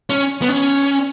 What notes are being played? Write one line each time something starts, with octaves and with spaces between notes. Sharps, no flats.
C#4
B3
C#4